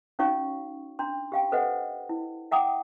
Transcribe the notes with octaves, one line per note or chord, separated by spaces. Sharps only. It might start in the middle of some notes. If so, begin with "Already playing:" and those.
C#4 D#4 F#4 C#5 F5 C#6
D4 A#5 C6
G4 F5 G5
A4 B4 C5 D#5 F#5
E4
E5 F#5 G5 A#5 D6 D#6